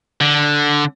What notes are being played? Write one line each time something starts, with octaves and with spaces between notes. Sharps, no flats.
D3